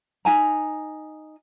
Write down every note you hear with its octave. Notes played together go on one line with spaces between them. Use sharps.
D#4 G#5 A#5